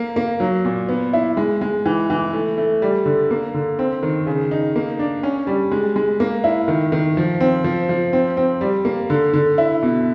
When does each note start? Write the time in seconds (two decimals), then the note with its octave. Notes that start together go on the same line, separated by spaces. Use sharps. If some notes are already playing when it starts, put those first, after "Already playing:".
Already playing: A#3
0.16 A#3
0.40 F#3
0.65 A#2
0.89 B3
1.13 E4
1.37 G#3
1.61 G#3
1.86 E3
2.10 E3
2.33 A3
2.58 A3
2.82 G3
3.06 D3
3.31 A#3
3.54 D3
3.79 C4
4.03 D#3
4.27 C#3
4.51 D#4
4.76 A#3
4.99 D4
5.23 C#4
5.47 G3
5.71 G#3
5.96 G#3
6.20 A#3
6.44 E4
6.68 D#3
6.92 D#3
7.17 F3
7.40 C4
7.64 F3
7.89 F3
8.13 C4
8.37 C4
8.61 G3
8.85 A#3
9.10 D3
9.33 D3
9.58 E4
9.83 B2